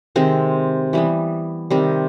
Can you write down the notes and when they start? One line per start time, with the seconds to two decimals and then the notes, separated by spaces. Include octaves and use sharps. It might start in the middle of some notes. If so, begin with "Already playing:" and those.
0.16 C3 D#3 G#3 C4
0.93 E3 G3 B3
1.70 C3 D#3 G3 C4